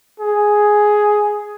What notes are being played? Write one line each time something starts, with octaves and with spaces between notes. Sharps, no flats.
G#4